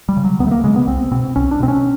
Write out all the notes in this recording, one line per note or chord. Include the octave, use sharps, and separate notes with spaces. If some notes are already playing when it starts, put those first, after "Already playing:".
G3
C#3
F#3
D2 B3
A3
A#3
C#3 G#3
B3
C2 C4
B2 C4
C2 C#4
D4
B2 C4
C#4